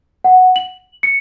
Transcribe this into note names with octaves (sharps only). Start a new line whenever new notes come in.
F#5
F#7
C#7